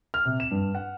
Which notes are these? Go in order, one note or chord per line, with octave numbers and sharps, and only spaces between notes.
F6
C3
E7
G2
F#5